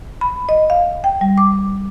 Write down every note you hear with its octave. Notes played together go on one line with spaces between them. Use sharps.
B5
D#5
F5
G5
G3
D6